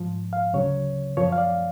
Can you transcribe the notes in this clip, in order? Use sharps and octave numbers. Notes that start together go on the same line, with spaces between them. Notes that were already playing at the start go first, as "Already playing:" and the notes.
Already playing: G#2 F3
F5
D2 C#3 F#3 C#5
F#2 F3 C#5
F5
D5